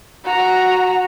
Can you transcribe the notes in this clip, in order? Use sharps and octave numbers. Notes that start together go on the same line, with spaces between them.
F#4 A#5